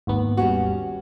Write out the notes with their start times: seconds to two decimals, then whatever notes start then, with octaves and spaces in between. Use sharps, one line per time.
0.07 G#1 D#2 B3
0.37 G3 C#4 F#4